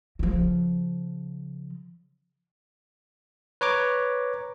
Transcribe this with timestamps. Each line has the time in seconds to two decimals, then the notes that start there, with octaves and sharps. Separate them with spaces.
0.19 C#3 F3
3.61 B4 C#5 A#5 D6